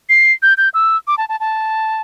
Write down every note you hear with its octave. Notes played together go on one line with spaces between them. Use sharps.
C7
G6
G6
E6
D6
A5
A5
A5